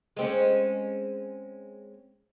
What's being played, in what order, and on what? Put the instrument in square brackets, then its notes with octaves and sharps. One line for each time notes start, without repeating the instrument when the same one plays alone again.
[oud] G#3 C4 C#4